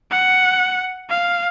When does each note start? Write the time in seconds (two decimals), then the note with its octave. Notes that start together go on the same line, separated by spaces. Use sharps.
0.11 F#5
1.10 F5